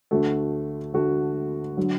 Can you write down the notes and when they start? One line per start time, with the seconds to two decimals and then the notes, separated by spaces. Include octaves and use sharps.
0.11 D2 D3 A3 F#4
0.93 D2 D3 A3 F#4
1.77 D3 F#3